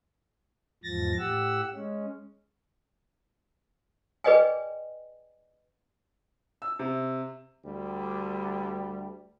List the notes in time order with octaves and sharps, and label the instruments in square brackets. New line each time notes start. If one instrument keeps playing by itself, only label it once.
[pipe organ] E2 G#2 F3 A6 A#6
A2 G4 F#5 E6
G#3 C#4
[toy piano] G#4 B4 D5 D#5 G5 G#5
[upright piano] E6
C3
[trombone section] D2 G3